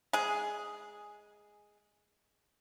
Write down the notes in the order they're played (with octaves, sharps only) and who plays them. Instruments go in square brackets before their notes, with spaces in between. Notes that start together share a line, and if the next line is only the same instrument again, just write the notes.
[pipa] G#3 G#4